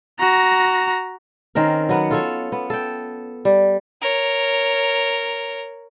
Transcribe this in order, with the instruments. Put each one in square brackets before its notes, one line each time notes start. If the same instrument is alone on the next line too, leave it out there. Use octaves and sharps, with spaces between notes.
[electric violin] F#4 A#5
[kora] D#3 C4 C#4 A#4
F#3 B3 F#5
F4 A4 C#5
B3
A4 G5
G3
[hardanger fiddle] A#4 C#5